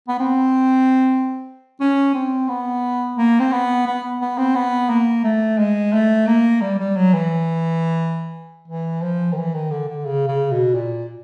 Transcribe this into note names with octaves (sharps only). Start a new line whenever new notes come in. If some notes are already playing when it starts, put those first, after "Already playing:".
B3
C4
C#4
C4
B3
A#3
C4
B3
B3
B3
C4
B3
A#3
A3
G#3
A3
A#3
G3
G3
F#3
E3
E3
F3
D#3
E3
D#3
D3
D3
C#3
C#3
B2
A#2